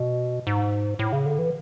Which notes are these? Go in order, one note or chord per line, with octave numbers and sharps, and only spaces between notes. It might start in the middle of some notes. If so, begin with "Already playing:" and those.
Already playing: B2
G#2
A2
C#3
D3
E3